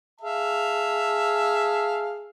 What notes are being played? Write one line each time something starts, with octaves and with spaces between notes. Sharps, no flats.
G#4 E5 F5 A5